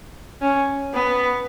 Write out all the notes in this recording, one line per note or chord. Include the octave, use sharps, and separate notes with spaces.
C#4
B3